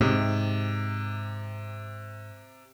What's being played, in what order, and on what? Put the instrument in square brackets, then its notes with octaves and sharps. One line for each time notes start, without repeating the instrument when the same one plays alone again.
[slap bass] G#2 [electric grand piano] C3